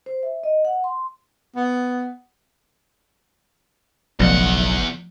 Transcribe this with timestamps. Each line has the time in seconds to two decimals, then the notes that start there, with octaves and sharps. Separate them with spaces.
0.06 C5
0.23 E5
0.43 D#5
0.65 F#5
0.84 C6
1.56 B3
4.19 F#1 B1 E2 F3 A3 F#5